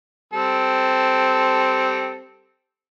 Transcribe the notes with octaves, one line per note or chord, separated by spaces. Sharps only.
G3 C4 A4